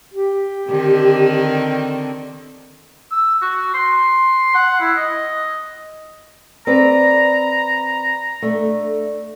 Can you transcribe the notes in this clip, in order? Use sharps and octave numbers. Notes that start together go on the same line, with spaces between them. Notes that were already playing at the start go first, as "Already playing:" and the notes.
G4
D3 D#3 C4
E6
F#4
C6
F#5
E4
D#5
C4 B4 D5 A#5
A3 D4